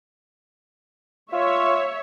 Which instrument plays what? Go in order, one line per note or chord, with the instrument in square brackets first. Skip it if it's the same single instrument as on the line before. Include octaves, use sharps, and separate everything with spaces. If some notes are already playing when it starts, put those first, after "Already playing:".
[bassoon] F4 [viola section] C#5 E5